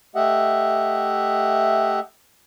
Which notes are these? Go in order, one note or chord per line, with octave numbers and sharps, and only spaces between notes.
A3 G4 D#5 E5 F#5